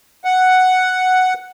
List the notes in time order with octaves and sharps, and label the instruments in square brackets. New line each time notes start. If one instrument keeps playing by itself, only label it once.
[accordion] F#5